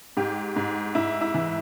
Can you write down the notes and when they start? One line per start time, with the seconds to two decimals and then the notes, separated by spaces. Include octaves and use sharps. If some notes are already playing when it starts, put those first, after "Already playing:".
0.17 G#2 G4
0.56 G#2
0.95 G#2 E4
1.21 E4
1.34 E3